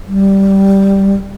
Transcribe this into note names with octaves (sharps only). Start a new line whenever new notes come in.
G3